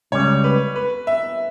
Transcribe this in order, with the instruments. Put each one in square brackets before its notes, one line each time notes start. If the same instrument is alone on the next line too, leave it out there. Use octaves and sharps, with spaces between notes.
[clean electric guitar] C#2 C#3 G3 [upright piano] C#5
[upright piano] B4
B4
E5